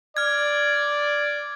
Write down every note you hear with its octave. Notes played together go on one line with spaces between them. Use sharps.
D5 F6 G#6